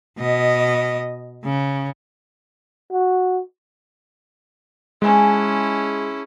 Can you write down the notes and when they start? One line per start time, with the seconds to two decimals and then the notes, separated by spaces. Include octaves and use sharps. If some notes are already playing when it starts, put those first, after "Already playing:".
0.19 B2 D#5
1.44 C#3
2.92 F#4
5.02 G#3 C#4 E4 G#4 G#5 A5